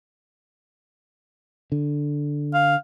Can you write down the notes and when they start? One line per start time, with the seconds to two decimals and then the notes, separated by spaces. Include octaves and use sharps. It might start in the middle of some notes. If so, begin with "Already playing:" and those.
1.72 D3
2.54 F5